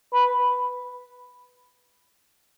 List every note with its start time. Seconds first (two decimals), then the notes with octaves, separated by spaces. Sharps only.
0.13 B4